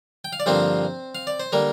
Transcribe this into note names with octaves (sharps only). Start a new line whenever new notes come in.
G5
F5
D5
G2 D3 F3 A#3 C4 C5
F5
D5
C5
D3 G3 A#3 A#4